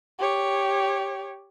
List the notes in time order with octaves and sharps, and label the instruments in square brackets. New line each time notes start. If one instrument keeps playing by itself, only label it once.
[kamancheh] G4 C#5